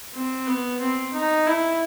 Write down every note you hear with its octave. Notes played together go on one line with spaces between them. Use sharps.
C4
B3
C4
D#4
E4